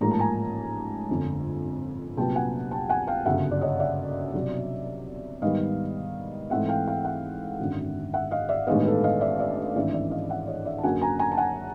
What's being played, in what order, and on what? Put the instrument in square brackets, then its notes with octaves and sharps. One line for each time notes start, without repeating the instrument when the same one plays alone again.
[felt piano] A1 G#2 F3 A#3 A#5
A5
G#5 A#5
G1 F2 D3
C2 A#2 F#3 B3 G5 A5
F#5 G#5
G5 A5
F#5 G#5
F5 G5
G1 F#2 C#3 E5 F#5
D5
C#5 D#5
D5 E5
C2 B2 F#3
G#2 D#3 G3 B3 D#5 F5
G#2 E3 A3 C4 E5 F#5
F5 G5
F5 G5
E5 F#5
G#1 F#2 D3
E5 F#5
D#5 F5
D5 E5
A1 G2 D#3 G#3 B3 D#5 F5
A4 B4
D#5 F5
D5 E5
D5 E5
G#1 G2 E3 A3 C#4 D5 E5
D5 E5
D#5 F5
E5 F#5
C#5 D#5
D5 E5
A5
F#2 D3 F#3 A#3 C#4 F#5 G#5
G#5 A#5
G#5 A#5
A5
F#5 G#5